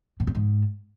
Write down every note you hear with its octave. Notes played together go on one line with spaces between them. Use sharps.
A2
G2
G#2